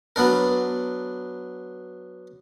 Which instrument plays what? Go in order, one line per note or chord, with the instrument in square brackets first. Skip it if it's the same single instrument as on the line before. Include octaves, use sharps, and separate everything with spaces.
[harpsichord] F#3 B3 D4 A#4